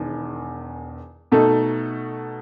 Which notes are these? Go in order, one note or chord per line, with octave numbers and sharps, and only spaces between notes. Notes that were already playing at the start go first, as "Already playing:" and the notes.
Already playing: E1 E2 D#3
B2 A3 D#4 A4